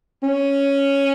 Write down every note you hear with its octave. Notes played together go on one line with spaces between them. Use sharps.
C#4